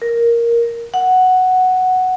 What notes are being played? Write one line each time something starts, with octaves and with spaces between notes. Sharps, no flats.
A#4
F#5